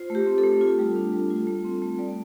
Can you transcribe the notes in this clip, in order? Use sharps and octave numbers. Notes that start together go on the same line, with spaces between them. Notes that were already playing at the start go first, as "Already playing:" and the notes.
Already playing: F4 C5
A3
G4
C4
A4
A3
F4
G3
D4
G3
F4
A3
C4
A3
G3 D5